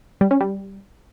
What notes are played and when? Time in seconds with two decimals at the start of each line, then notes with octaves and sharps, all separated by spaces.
0.21 G3
0.31 C#4
0.41 G3